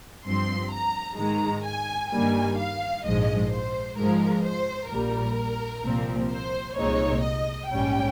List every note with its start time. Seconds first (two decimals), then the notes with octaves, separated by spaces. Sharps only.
0.25 G2 F3 C4 C6
0.71 A#5
1.17 G#2 D#3 G#3 A#5
1.64 G#5
2.10 G2 D#3 G3 A#3 G#5
2.57 F5
3.04 A#1 G#2 F3 G#3 D#5
3.51 C5
3.97 G#2 F3 G#3 A#4
4.44 C5
4.91 A#1 A#2 G3 A#4
5.84 C2 A#2 F3 C4
6.31 C5
6.77 C2 A#2 G#3 C4 D#4 C#5
7.23 D#5
7.70 A#1 G#2 G3 C#4 G5